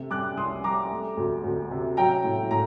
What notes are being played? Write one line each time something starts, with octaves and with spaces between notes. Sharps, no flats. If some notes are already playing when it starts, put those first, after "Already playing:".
Already playing: C3 A3
G3 D6 F#6
C2 C6 D#6
G3 A#5 D6
A3
D2
D2
C3
F#3 G5 A#5
A2
A2 A#5